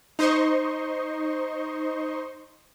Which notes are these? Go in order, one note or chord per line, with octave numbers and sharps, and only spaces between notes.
D#4 C5 D#5 C6 C#6